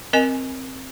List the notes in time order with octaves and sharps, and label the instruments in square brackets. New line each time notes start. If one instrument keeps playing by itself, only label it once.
[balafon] C4 A#4 D#5 G#5